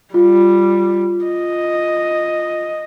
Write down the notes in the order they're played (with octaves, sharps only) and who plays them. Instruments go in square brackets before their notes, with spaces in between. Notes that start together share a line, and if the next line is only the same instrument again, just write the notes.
[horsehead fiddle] G3 [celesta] F4
[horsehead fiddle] D#5